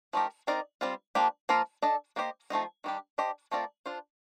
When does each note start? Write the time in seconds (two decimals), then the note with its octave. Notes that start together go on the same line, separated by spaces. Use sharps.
0.13 F3 A3 D#4 G4 A#4
0.47 C4 D#4 A#4 D5
0.81 G3 C4 F4 C5
1.15 F3 A#3 D4 G4
1.49 F3 A#3 F4 A#4
1.82 D4 A4 D#5
2.16 A#3 D4 G4 C5 D#5
2.50 F3 A3 C4 D#4
2.84 D#3 G3 D4 G4
3.18 D4 G4 C5 D#5
3.51 A3 C4 F4 A#4 D5
3.86 D4 F4 C5